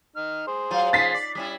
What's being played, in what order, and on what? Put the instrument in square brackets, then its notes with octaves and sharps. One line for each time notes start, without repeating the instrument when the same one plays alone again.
[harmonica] D#4 F6
G#4 C5
[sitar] F#3 F4
[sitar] F3 C#4 D#4 [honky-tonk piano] A6 B6 C7
[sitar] D5
G3 C#4 E4